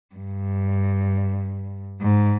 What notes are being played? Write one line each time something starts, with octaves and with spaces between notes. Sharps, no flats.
G2
G#2